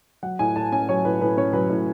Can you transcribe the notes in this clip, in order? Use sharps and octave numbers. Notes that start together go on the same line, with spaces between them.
F#3 F#5
A2 G#5
A2 A5
C#4 G#5
F#3 C#5
A2 B4
A2 B4
C#4 C#5
F#3 B4
A2